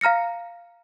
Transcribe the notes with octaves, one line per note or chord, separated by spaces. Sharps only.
F5 A#5 F6 A#6 C#7